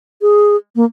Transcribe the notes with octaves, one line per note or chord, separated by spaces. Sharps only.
G#4
A#3